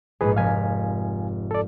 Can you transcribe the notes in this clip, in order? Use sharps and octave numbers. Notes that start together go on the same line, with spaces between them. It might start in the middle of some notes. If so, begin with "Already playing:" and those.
A#1 G#2 G#4 B4
F1 A#4 F5 G#5 B6
A4 D5